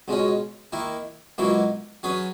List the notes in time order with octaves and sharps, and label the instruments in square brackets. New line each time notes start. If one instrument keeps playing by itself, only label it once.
[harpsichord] C#2 B2 G#3 C#4
D#3 A#3 E4
C#2 B2 F#3 A#3 E4
F#3 C#4 G#4 B4